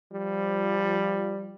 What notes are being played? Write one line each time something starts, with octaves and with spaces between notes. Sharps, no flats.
F3 G3